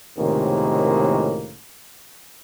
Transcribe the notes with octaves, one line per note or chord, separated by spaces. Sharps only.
C#2 A2 C3 D#3 A#3